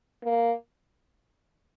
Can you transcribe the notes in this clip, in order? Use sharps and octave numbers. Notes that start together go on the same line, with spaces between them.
A#3